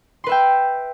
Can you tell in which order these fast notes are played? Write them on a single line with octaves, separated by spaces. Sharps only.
C6 B4 E5 G5